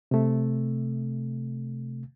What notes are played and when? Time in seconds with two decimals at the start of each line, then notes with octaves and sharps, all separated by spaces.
0.11 C3 A3